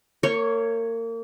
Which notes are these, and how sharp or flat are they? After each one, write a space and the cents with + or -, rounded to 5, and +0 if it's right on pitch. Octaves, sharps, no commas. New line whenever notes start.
A#3 -30 C#5 +0